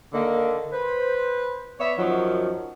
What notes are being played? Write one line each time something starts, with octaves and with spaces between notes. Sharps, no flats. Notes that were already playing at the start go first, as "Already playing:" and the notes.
D3 D#3 A#3
B4 C5
B3 C#5 D5 E5
F#2 D#3 F3 F#3